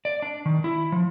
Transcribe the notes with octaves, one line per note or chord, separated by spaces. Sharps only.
D5
D4
D#3
E4
F3